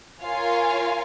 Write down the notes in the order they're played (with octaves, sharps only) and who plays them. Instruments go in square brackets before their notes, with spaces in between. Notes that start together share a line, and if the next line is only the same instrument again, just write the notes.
[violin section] F4 A#4 C#5 F5 G#5